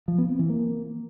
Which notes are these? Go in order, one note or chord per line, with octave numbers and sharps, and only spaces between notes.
F3
B3
C4
E3
A#3